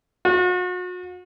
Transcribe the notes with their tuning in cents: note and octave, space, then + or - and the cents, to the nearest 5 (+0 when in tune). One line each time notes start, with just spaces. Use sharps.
F#4 -40